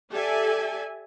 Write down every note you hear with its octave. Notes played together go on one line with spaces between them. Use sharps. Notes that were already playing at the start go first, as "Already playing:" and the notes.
G4 A4 D5 E5 G#5